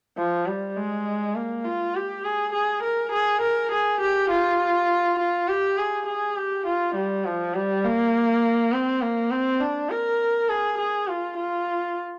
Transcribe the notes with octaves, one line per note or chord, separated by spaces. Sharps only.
F3
G3
G#3
A#3
F4
G4
G#4
G#4
A#4
G#4
A#4
G#4
G4
F4
F4
G4
G#4
G#4
G4
F4
G3
F3
G3
A#3
C4
A#3
C4
D4
A#4
G#4
G#4
F4
F4